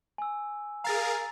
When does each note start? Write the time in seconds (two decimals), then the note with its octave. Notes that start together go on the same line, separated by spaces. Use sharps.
0.18 G#5 E6
0.84 G#4 A#4 F5 A#5 A6